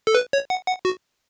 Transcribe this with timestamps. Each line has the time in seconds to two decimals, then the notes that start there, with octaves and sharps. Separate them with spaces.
0.07 A4
0.15 B4
0.33 C#5
0.50 F#5
0.67 F#5
0.85 F#4